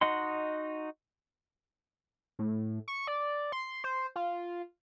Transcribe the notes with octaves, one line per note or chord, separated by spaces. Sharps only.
D#4 F#4 D#5 F#5 C6
A2
C#6
D5
C6
C5
F4